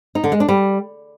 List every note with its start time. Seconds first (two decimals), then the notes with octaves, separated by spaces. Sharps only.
0.15 D#4
0.24 D3
0.32 G#3
0.40 D4
0.49 G3